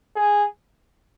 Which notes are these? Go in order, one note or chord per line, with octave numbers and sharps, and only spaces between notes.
G#4